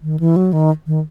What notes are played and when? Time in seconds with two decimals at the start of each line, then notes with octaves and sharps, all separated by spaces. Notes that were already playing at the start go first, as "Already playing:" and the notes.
0.03 D#3
0.20 E3
0.36 F#3
0.53 D#3
0.87 D#3